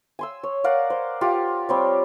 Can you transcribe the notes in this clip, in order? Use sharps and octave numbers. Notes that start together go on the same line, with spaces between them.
G#5 C6 E6
C#5
A#4 D5 F5 F#5
C5
F4 G4 F#5
G3 C4 C#5